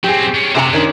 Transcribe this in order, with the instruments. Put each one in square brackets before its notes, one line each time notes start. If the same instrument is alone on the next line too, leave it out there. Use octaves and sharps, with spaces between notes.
[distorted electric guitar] F#3 C4 [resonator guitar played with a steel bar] G4 G#4
[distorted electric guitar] C#4 D4
[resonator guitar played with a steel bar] C3 G4 A#5 [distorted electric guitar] C5 F#5
[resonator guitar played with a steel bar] D#3 C#4 D4